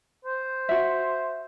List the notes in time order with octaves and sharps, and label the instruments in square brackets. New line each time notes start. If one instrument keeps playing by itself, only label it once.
[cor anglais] C5
[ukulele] F#4 E5